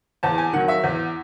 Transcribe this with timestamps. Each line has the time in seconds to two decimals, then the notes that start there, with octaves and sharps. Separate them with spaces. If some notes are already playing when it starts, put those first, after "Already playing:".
0.23 E2 A5
0.38 G#5
0.53 D#3 F#3 F#5
0.68 E5
0.83 E2